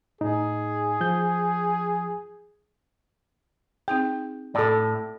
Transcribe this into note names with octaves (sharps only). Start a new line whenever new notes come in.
A2 D#4 G#4
F3 G6
C4 D#4 G#4 G5
A2 A4 D5